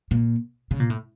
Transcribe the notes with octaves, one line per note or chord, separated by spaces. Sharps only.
A#2
C#3
A#2
A2